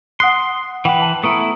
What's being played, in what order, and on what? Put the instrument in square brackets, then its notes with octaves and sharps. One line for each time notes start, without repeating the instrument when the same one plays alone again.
[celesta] F#5 D#6 F#6 [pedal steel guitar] C6
[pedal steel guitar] E3 B4 [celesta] F#5 G5
[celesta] A5
[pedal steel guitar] A3 B3 E4 [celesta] A#5 C#6 D#6